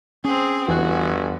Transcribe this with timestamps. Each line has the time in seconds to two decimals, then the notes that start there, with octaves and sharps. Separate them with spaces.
0.24 C4 C#4 G#4
0.68 G1 E2 E3 F#4 G#5 F#6